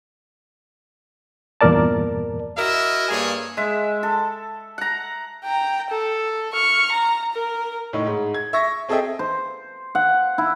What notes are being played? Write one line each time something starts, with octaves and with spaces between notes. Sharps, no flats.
E2 G2 A#2 A#4 D5 A5
E4 F#4 A#4 D#5 E5
G2 A#3 G#4 C#5 G#5
G#3 E5
A4
F#5 A#5
G5 A#5
A4
C#6 F6
A#5
A#4
A2 D#4
G#2
G#6
E5 C#6 A#6
C4 G#4 A4 D#5 E5 G5
C5
F#5
E4